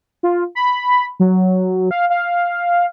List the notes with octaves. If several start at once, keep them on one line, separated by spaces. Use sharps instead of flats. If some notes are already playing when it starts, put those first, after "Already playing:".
F4
B5
F#3
F5
F5